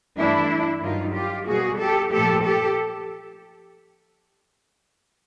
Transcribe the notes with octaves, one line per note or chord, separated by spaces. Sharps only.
G2 E3 A3 D4 E4
G2 D#3 F#3 D#4 F4
F4 G4
B2 G3 A#3 F#4 G#4
G4 A4
A#2 F3 A3 G4 A4
G4 A4